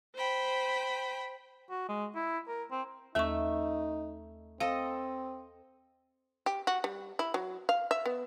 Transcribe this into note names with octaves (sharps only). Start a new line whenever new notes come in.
C5 G5 B5
F#4
G#3
E4
A#4
C4
D#2 A3 D#4 E5 C#6
C4 A4 D#5 F5
G4
F#4
G3
E4
F#3
F5
E5
B3